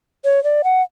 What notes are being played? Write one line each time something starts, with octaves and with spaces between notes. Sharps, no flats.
C#5
D5
F#5